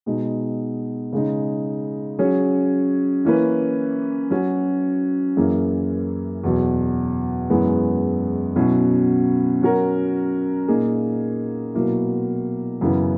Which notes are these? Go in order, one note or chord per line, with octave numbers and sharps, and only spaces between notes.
B2 G#3 D#4
C#3 G#3 D#4
F#3 C#4 G#4 C#5
E3 A#3 C#4 E4 B4
F#3 C#4 F#4
F#2 E3 A#3 E4 G#4
E2 B2 F#3
F#2 E3 G#3 B3
B2 F#3 C#4 E4
F#3 C#4 F#4 A#4
A#2 A#3 D#4 G#4
B2 F#3 A#3 E4
F#2 C#3 E3 B3